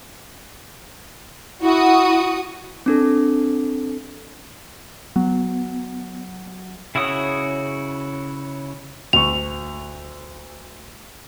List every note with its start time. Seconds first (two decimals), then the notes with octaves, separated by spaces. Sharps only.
1.62 E4 F#4 D#6
2.86 C4 D4 A4
5.16 F#3 B3
6.95 C#3 E4 F#4 C#5 D#6
9.13 D2 C#6 F7